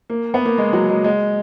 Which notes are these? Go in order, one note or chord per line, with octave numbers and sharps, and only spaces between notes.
A#3
B3
A#3
G#3
F#3
G#3
G#3